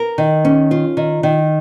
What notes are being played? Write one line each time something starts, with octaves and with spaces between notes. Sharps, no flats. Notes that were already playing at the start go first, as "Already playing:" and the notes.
Already playing: A#4
D#3
C#4
F4
D#3
D#3